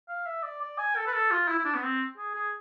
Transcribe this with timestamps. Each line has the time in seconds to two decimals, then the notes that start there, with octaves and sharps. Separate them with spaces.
0.09 F5
0.26 E5
0.43 D5
0.61 D5
0.78 G#5
0.96 A4
1.07 B4
1.14 A4
1.31 F4
1.48 E4
1.59 E4
1.65 D4
1.75 B3
1.83 C4
2.18 G#4
2.35 G#4